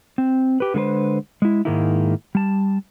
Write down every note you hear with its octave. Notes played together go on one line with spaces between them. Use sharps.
C4
G4 B4
D3 G#3 G#4 B4 C5
G#3 E4
G#2 D#3 G#3 A#3 D#4 E4
G3 A5